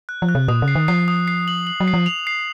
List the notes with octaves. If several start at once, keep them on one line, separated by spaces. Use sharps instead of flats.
F#6
F3
F#6
C3
A#2 D#6
C#3
C7
D#3
F3 C7
D#6
C7
F#7
F#7
F#3
C7
F3
F7
C7